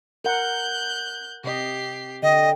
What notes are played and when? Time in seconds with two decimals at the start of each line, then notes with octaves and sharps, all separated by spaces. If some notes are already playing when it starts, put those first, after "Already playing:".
0.25 A#4 F#5 F#6 G6
1.44 C3 G4 D#5 C7
2.23 D3 D#5 G5